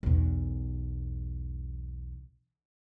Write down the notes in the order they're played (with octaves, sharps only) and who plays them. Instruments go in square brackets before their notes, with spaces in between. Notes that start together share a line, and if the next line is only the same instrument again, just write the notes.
[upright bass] B1 E2